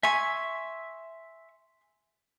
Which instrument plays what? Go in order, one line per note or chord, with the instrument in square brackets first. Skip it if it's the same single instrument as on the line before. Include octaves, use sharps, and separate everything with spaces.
[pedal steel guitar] E5 C#6 [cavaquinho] G#5 C6